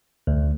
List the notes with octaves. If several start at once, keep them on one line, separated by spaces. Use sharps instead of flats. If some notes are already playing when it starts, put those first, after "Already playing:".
D2